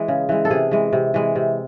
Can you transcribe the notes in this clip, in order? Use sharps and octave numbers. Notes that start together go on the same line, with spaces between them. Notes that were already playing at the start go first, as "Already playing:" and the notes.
Already playing: E3 G#3
C#3
E3 G#3
A4
C3 G#4
E3 G#3
C3
E3 G#3
C3